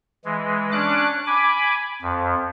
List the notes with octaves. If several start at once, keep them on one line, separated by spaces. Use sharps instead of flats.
E3 G#3
C#4 D4 D6 F#6
G#5 B5 D6
F2